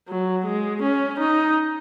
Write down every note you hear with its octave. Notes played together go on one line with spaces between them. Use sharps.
F#3
G#3
C#4
D#4